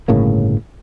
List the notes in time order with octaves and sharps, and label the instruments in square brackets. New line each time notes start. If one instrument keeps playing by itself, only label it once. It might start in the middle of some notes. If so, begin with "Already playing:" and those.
[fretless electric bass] G1 A2 C#3 A#3